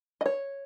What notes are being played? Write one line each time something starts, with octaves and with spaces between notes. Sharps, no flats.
D#5
C#5